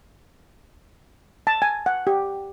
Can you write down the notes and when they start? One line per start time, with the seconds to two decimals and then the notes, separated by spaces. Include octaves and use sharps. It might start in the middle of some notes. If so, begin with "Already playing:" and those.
1.47 A5
1.62 G#5
1.86 F#5
2.07 G4